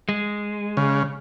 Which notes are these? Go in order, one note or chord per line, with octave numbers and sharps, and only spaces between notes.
G#3
C#3